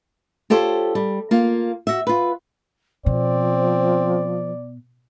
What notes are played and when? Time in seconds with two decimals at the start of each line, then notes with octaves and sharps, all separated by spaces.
0.50 F4 G4 A4 C5 C#5
0.95 G3
1.31 A#3 F4
1.87 F#4 E5
2.07 F4 B4
3.06 B2 F3 C4 D5